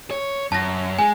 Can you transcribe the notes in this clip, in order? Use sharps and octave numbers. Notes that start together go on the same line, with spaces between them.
C#5
F#2 A5 A#6
G#3 G#5